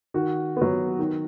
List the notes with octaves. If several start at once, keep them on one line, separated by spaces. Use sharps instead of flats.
D#3 F#4
B3
F#3
D#3